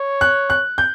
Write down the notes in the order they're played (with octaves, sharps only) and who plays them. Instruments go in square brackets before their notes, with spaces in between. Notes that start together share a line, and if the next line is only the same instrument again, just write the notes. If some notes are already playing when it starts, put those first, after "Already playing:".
Already playing: [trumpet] C#5
[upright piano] F#6
F#6
G6